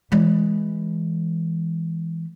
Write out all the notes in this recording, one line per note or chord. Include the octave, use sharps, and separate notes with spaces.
E3 G#3